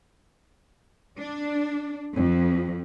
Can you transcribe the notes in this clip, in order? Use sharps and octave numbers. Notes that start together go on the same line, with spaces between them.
D4
F2